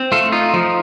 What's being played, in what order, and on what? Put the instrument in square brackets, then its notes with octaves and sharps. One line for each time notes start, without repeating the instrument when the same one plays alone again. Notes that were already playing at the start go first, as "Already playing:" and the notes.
Already playing: [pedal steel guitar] C4
A3 F4 A4
D#4 F4
F3